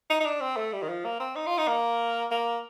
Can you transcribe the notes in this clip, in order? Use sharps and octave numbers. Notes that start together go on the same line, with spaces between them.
D#4
D#4
D4
C4
A3
G3
D#3
F3
A#3
C4
D#4
F4
D#4
A#3
A#3